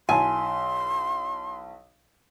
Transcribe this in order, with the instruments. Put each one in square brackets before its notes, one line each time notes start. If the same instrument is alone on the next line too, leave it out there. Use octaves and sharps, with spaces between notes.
[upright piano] B1 E4 A5 [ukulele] G#5 [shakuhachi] C6